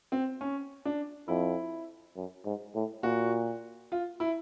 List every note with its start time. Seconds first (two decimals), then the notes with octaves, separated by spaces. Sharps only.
0.12 C4
0.41 C#4
0.85 D4
1.28 F2 E4
2.16 F#2
2.45 G#2
2.75 A2
3.03 A#2 F#4
3.92 F4
4.20 E4